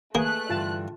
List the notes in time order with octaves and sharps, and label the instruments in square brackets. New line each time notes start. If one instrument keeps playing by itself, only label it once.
[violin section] A3 F#6 [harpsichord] A#3 [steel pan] G#4 [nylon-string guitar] B4
[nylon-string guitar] G2 D3 E3 [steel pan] F4 A5